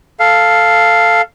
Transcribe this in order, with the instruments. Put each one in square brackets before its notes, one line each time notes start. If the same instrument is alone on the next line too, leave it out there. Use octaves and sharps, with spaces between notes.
[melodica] A4 F5